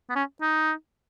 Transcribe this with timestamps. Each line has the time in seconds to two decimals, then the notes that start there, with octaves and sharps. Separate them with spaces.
0.10 B3
0.16 C#4
0.42 D#4